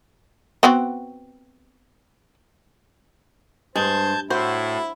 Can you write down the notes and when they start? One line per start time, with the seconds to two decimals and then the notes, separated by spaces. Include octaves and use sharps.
0.63 B3 C4 F#4
3.76 G2 G#3 C5 A5 G6 G#6
4.30 A2 E4 F#4 C5